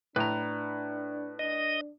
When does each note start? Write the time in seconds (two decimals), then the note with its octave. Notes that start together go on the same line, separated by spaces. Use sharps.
0.16 A2 D4 B4 A#5
1.39 D4 D#5